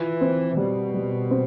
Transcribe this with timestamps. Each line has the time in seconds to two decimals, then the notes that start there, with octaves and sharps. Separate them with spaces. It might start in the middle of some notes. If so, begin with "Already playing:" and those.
Already playing: E3 F4
0.21 C4
0.57 B2 G3
0.94 G3
1.31 C4